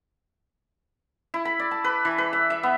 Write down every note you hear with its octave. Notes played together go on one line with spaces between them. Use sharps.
E4
B5
D5
A5
B4
E3
B4
E5
E5
B3